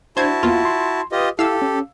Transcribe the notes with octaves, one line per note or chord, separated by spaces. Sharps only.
D4 E4 F#4 C5 A5 G#6
E2 A#3 B3 F4
C6
F4 G4 B4 D#5 D#6
E4 G4 A4 F5 E6
C#4